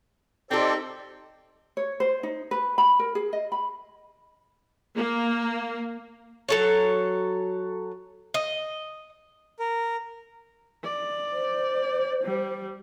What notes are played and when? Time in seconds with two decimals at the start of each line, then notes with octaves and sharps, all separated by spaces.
0.51 C4 D#4 G4 A4 C5 D5
1.77 C#5
2.00 C5
2.23 D#4
2.51 B4
2.78 B5
2.99 A#4
3.15 G#4
3.33 D#5
3.52 B5
4.96 A#3
6.49 F#3 A4 C#5
8.34 D#5
9.59 A#4
10.84 D5
11.32 C5
12.24 G3